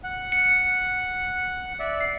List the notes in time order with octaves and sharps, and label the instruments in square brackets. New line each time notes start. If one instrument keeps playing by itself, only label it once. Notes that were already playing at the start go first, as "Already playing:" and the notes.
[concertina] F#5
[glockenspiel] C#7
[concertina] D5 E5
[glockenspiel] C7